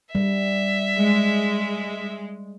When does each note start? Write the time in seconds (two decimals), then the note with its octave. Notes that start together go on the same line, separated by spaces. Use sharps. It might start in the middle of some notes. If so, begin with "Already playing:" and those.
0.15 G3 E5
0.98 G#3